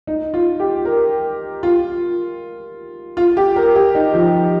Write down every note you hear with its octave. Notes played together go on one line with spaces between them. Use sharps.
D#4
F4
G4
A#4
F4
F4
G4
A#4
G4
D#4
F3
F3